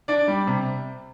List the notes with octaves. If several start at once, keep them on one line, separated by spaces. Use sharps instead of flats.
D4 D5
G3
C3